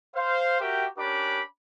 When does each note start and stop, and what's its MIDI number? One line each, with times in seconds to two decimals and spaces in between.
0.16 0.58 72
0.16 0.58 77
0.61 0.86 66
0.61 0.86 67
0.61 0.86 70
0.61 0.86 76
0.61 0.86 79
0.98 1.41 61
0.98 1.41 62
0.98 1.41 67
0.98 1.41 70
0.98 1.41 83
0.98 1.41 86